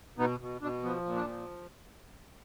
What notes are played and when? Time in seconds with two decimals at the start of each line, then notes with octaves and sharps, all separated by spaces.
0.18 B2 B3 D#4
0.40 B2
0.61 B2 D4
0.83 F3 B3
1.05 A#2
1.16 D4
1.27 F3